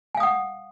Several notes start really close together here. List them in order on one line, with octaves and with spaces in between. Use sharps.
G#5 F5 D#6 F#5